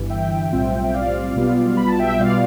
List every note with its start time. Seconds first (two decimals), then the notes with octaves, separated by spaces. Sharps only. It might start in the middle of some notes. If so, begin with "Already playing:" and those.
Already playing: G1 G2 E3
0.10 E5 G5
0.52 B1 A2 G3 C4 F4
0.84 G5
0.94 D5 F5
1.36 B1 B2 G3 B3 F4
1.77 B5
1.88 A5
1.99 E5 G5
2.19 B2 G3 B3 F4 D5 F5